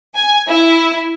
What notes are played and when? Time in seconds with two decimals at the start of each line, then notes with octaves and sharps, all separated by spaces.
0.15 G#5
0.49 E4